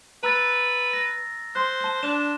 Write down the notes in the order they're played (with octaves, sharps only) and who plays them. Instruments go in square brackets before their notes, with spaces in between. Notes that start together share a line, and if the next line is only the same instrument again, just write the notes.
[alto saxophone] B4 [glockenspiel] A#5 E6 A6
[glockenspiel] A#6
[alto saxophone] C5 [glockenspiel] C6 F#6
[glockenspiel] A5 G7
[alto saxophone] D4 [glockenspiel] E7